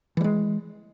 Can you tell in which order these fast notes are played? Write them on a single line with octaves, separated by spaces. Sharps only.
E3 G3 G#3